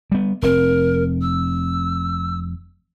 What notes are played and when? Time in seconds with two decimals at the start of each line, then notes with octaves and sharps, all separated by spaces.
0.12 G3 B3
0.42 F1 A2 C4 A#4
1.22 E6